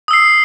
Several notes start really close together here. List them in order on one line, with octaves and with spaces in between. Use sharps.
D#6 E6 C7